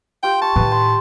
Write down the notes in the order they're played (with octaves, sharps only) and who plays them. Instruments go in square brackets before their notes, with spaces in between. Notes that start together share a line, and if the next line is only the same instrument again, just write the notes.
[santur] F4 G4 C6 [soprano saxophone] G5
[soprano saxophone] A5 [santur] C#6
[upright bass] A2 D#3 [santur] B4
[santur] C6